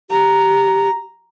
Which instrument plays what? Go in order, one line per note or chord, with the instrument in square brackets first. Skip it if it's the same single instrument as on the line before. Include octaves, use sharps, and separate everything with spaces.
[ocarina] G4 [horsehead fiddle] A#5